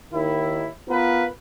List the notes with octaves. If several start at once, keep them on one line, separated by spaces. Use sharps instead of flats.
D#2 D#3 E4
B3 F4 A#4 B4